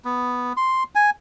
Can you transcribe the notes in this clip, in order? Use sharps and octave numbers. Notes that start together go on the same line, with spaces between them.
B3
C6
G#5